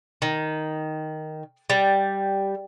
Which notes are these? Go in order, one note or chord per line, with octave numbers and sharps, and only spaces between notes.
D#3
G3